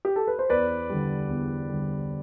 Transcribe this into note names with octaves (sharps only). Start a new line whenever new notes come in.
G4
A4
B4
C5
E2 B4 D5
D3 G3
E2
D3 G3